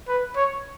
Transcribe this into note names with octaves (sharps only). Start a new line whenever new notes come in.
B4
C#5